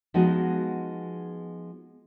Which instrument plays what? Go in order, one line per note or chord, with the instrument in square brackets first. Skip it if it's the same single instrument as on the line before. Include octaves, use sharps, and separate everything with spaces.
[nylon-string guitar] F3 G#3 B3 D#4 F#4 G#4